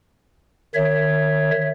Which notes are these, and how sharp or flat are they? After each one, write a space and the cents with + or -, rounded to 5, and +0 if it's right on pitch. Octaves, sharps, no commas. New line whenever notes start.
D#3 -30 C#5 +0 E5 +0